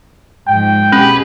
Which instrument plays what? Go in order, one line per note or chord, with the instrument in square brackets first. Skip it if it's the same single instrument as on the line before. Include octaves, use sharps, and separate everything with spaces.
[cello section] G#2 F3 [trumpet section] G5
[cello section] B2 G4 G#4 [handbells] C#4 [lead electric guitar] B4